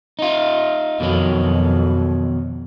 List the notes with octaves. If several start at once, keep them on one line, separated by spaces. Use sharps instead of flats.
D#4 F4
F2 B2 D#3 F#3